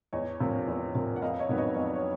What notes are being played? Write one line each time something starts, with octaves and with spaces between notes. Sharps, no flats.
E2 C#5 D#5
C3 F3 A#3
E2
C3 F3 A#3
F#5
F2 D#5 F5
C#5 D#5
C3 D#3 F#3 B3
C#5 D#5
F2 D#5
D5
C#5